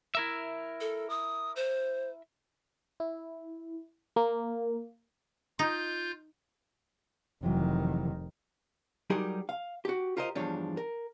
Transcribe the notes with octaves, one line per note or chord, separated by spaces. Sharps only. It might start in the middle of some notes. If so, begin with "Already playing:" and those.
E4 A#4 E5
A4
D#6
C5
E4
A#3
D#4 F4 G6
F1 C3 D#3 E3 F#3
F#3 G3 D#4 G4 G#4 A#4
F5
F#4 G4
F4 G4 A#4 C5 D#5
E2 G2 F3 D4 C#5
A#4